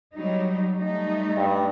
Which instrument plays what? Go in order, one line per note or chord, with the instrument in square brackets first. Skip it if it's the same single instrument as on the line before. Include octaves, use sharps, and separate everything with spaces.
[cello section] F#3 G3 D#4
G3 A3 D#4
[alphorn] G2